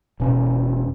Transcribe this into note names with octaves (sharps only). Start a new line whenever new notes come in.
E1 B2 C#4